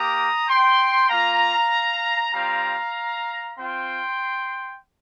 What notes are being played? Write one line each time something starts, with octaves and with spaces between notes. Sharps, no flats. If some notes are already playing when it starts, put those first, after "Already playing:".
Already playing: A#3 G4 A#5 D#6
G5 C6
A#3 F4 F5 A#5
G3 C4 F4 F5 A#5
C4 F4 G5 C6